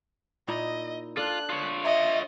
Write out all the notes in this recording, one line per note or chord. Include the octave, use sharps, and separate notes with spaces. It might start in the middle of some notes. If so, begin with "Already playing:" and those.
A#2 D#4 E4 D#5
D4 F4 A4 F#6
F4 C#5
D#5 E5